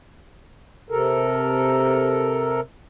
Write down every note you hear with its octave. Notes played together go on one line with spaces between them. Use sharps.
C3 A4 A#4